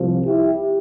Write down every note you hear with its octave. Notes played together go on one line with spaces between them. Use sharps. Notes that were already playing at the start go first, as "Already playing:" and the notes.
Already playing: C2 C3 F3
E4 G4